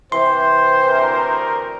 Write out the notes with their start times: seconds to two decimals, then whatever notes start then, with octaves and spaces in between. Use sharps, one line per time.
0.12 C3 E3 C5 C6
0.89 D2 A#4